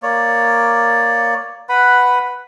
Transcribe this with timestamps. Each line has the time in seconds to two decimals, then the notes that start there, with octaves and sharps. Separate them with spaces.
0.03 A#3 C#5 D5
1.69 B4 F#5 B5